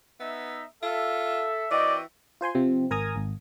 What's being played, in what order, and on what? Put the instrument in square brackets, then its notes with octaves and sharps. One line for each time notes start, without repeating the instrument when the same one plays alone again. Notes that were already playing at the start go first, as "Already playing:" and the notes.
[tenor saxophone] B3 [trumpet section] D#4 E5
[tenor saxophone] F4 [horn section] A4 [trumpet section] E5
[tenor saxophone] E3 [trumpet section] C4 F#4 G5 [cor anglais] D5 [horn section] D#5
[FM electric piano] F4 C5 G#5 C6
C3 F3 C4
G#1 A#4 G#5 A#5 D#6 G#6
G#1